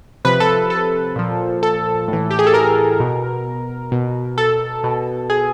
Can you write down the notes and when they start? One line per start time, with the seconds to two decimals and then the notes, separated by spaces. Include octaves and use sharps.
0.25 C3 F3 B4
0.40 A4
0.70 A4
1.16 A#2 F3
1.63 A4
2.08 A2 E3
2.31 G4
2.39 G#4
2.47 A4
2.54 A#4
3.00 B2
3.92 B2
4.38 A4
4.84 B2
5.30 G#4